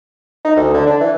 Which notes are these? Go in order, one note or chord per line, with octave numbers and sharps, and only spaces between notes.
D#4
D2
D3
D4
E3